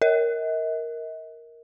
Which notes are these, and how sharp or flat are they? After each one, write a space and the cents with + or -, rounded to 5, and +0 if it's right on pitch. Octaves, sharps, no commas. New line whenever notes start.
A#4 +0 D#5 +45